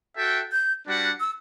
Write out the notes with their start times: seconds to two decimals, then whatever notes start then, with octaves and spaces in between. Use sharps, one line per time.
0.17 F#4 A4 E5 G5
0.52 G6
0.86 G3 D4 F#4 B4 F#5
1.20 E6